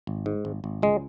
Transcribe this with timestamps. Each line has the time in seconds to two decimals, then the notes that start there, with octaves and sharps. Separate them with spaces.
0.07 G#1
0.26 G#2
0.45 G#1
0.64 G#1
0.82 C#2 G#3